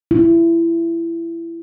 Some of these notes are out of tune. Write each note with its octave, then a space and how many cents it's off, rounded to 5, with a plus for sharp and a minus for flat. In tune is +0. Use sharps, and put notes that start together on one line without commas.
E4 +20